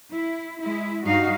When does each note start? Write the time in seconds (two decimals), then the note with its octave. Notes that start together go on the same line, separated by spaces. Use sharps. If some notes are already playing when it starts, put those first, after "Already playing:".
0.12 E4
0.62 G#3 E4
1.05 G2 D#4 F#4 F5